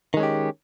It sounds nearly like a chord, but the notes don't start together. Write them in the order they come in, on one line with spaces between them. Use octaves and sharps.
D#3 G#3 C#4 G4